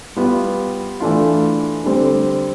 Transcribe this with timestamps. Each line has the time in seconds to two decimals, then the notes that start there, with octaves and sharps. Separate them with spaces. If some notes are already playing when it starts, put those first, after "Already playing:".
0.16 G3 B3 F4
1.00 E3 A3 D4 F4
1.84 D3 G3 C4